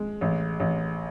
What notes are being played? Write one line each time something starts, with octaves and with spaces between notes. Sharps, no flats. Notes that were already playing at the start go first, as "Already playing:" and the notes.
Already playing: G#3
A1
A1